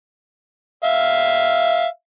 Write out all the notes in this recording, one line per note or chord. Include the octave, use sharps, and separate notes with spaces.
E5 F5